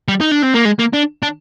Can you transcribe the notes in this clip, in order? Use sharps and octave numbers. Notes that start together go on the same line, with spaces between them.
G3
D#4
D4
C4
A#3
G#3
A#3
D4
D4